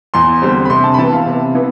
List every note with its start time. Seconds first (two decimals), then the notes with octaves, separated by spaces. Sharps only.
0.14 E2 C6
0.42 D3 G3 C4
0.65 B5
0.70 C3 C6
0.84 A5
0.94 B5
0.98 E3 B3 A5
1.13 F5
1.26 C3
1.55 E3 B3